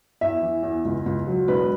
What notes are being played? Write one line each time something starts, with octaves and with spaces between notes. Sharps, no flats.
E2 E5
E3
E2
C#2
C#2
F#3
E1 B4